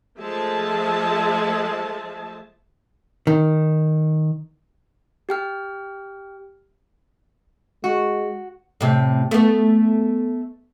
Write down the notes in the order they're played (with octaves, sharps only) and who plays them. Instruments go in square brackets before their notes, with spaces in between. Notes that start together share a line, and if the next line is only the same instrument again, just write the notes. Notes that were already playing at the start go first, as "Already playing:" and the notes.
[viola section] F3 G#3 A3 G#4 E5 A5
[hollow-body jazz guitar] D#3
[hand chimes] G4 G5 F6
[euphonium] G#3 [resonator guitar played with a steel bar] F#4
[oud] A2 C3
A3 B3